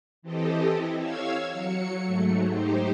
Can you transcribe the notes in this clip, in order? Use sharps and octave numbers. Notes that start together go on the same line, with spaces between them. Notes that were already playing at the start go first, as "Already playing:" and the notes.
E3 C4 G4 A4 D#5
E4
C#5 F5 E6 G#6
F#3 C#7
G#2 F#3 A3
D#4 G4 C5